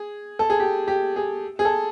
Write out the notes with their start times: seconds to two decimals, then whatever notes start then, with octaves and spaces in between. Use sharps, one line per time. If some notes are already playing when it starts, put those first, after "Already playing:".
Already playing: G#4
0.39 A4
0.50 G#4
0.60 G4
0.88 G4
1.16 G#4
1.59 G#4
1.65 A4